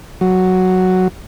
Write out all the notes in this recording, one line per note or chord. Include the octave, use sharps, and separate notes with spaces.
F#3